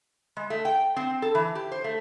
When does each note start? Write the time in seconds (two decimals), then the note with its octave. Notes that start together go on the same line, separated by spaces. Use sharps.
0.37 G#3
0.50 A3
0.65 G5
0.96 C4
1.22 A4
1.35 E3
1.55 G4
1.72 C5
1.84 A3